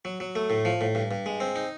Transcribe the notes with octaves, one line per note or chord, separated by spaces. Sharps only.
F#3
F#3
A3
A2
F3
A2
G2
G2
G#3
C4
D#4